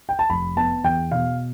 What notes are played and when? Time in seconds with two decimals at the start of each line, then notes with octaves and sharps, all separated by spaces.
0.09 G5
0.19 A5
0.30 F1 B5
0.57 B3 A5
0.84 E2 G5
1.12 B2 F5